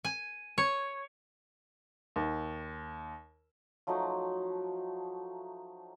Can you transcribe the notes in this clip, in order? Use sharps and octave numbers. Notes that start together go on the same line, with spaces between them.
G#5
C#5
D#2
F3 F#3 A3 D#4